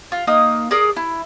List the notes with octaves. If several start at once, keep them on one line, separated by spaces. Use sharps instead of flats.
F4
A#3 D#4 D#6
G#4 A#4 D5 D#6
E4